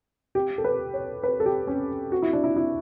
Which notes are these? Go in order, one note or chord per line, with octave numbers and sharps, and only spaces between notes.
G4
A4
B4
C#5
B4
A4
G4
C#4
F#4
E4
D4
E4
E4